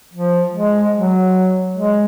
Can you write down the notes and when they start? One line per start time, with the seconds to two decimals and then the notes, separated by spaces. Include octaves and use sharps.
0.14 F3
0.54 G#3
0.94 F#3
1.75 G#3